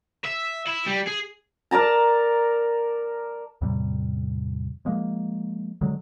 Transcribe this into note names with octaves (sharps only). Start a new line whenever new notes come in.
E5
E4
G3
G#4
A#4 D5 A5 A#5
E2 A2 C3 G3
F3 G#3 A#3
D3 F#3 G#3